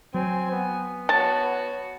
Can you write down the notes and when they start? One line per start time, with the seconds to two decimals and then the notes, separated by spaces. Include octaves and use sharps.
0.14 F#3 C4 G#5
0.52 B3
1.09 F#4 C#5 A5